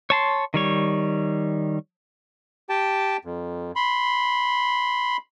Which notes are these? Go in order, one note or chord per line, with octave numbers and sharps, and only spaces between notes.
C#5 A5 C6
D#3 G3 C#5
G4 G5 A5
F2
B5 C6